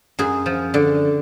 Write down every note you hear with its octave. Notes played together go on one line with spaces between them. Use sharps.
F#2 G#4
F3
D3